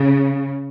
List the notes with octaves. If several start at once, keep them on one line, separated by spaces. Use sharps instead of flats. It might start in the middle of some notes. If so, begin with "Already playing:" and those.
Already playing: C#3